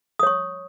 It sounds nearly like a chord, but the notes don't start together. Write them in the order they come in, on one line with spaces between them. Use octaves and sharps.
D#6 C#5 C#6